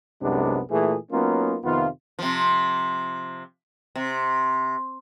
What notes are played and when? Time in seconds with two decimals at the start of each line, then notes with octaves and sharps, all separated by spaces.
0.21 C2 F#2 C3 G#3 B3 D4
0.71 A#2 E3 A3 G#4
1.12 F#3 A#3 B3 C#4 D#4 F4
1.64 F2 C3 D#3 B3 F4
2.19 C3 F3
3.96 C3